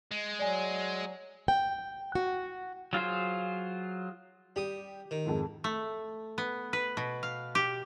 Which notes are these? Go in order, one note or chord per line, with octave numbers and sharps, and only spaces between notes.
G#3
F#3 D5 G#5
G5
F#4
F#3 F4 G#4 C5
G3 G4 D#6
D#3
F2 G#2 G#3
A3
B3
B4
B2
F5
G4